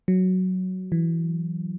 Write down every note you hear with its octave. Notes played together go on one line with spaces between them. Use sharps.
F#3
E3